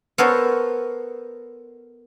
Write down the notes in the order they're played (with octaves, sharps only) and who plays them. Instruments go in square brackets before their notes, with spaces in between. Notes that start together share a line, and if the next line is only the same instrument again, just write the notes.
[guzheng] B3 A4 A#4 C5 C#5